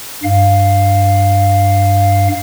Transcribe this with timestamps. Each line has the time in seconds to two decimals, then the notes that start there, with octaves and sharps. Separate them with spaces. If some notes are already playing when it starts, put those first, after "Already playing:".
0.23 G2 F5